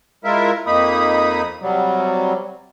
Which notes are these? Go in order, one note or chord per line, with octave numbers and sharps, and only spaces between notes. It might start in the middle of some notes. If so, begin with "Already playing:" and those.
G#3 E4 F4 A#4 E5
F2 A#3 D#4 B5 D#6
C3 F#3 G3